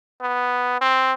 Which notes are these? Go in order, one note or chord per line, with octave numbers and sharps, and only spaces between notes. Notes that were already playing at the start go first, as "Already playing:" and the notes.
B3
C4